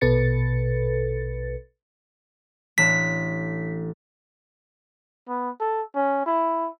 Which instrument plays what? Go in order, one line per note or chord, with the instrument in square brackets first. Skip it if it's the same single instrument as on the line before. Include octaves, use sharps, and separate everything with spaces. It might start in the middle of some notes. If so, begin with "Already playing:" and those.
[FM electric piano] A#1 B2 A4 B4 A6 C#7
[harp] A1 D4 E7 [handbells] B6
[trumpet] B3
A4
C#4
E4